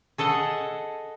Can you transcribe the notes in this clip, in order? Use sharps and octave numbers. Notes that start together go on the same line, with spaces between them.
G#4 A4 D#5 F#5